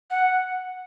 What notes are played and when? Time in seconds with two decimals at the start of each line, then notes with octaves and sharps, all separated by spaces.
0.10 F#5